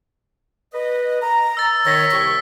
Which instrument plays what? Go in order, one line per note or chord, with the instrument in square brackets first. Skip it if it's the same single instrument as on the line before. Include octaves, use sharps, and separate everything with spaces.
[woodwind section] B4 D#5
A#5
[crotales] E6 A6
[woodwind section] D#3 C#5 [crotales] E6 A#6 B6
[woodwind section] C2 G5 C#6